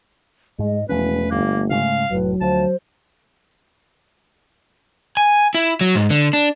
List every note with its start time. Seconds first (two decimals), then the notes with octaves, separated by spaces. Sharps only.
0.59 G#2 G#3 D#5
0.89 E1 E2 F3 A3 C#4 B4
1.31 G1 A#3
1.70 G#2 C#3 G#3 F5
2.11 F1 A2 F#3 B4
2.41 D2 F3 C5 A5
5.17 G#5
5.54 E4
5.81 F#3
5.95 G#2
6.10 D3
6.33 D4